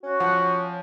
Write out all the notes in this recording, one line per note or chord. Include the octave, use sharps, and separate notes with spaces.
C#4 F#4
F3 F#5